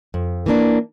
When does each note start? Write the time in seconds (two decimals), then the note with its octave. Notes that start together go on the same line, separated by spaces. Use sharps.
0.14 F2
0.46 E3 A#3 D4